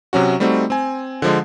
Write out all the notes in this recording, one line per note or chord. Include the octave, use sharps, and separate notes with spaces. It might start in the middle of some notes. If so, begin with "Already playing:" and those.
C3 F#3 C#4 F#4
G3 A3 C4 D#4 F#4
C4 G#5
D3 F3 G#3